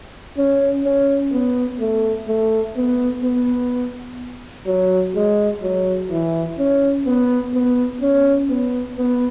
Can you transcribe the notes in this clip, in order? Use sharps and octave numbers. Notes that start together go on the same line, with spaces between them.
C#4
C#4
B3
A3
A3
B3
B3
F#3
G#3
F#3
E3
C#4
B3
B3
C#4
B3
B3